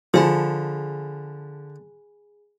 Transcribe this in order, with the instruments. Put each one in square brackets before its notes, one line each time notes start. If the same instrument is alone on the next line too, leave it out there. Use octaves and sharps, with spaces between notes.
[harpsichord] D3 [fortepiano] F3 [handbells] G#4 G#5 B5